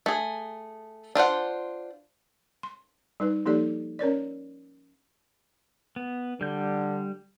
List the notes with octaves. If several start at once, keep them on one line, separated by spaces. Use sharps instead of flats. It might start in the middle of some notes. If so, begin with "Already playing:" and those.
A3 G#4
D4 F4 C5 F#5
C6
G3 D#4 B4
F3 A#3 D#4 G4 A4 D5
C#4 A#4 C#5 D5
B3
D3 G3 G6